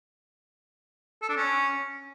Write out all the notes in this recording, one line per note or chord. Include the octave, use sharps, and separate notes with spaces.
A4
D4
C#4